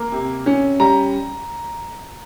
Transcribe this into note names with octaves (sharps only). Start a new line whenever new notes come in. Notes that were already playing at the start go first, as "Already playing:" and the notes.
Already playing: A#3
C3
C#4
G3 A#5